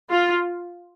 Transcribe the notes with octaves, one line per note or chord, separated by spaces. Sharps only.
F4